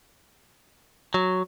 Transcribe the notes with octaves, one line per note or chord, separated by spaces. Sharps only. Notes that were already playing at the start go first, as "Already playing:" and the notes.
F#3